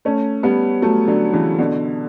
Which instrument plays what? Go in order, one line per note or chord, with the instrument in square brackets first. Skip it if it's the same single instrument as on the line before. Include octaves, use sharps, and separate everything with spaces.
[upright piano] A3 C#4
G3 B3
F#3 A3
D3 F#3
C#3 E3
B2 D3